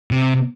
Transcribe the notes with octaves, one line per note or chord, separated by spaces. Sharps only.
C3